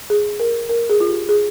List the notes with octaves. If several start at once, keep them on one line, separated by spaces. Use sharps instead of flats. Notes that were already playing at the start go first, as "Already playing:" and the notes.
G#4
A#4
A#4
G#4
F4
G4
G#4